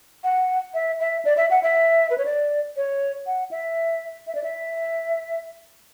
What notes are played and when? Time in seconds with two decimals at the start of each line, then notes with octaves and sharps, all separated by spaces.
0.24 F#5
0.74 E5
1.00 E5
1.25 D5
1.37 E5
1.50 F#5
1.63 E5
2.10 B4
2.18 C#5
2.25 D5
2.76 C#5
3.26 F#5
3.51 E5
4.27 E5
4.35 D5
4.44 E5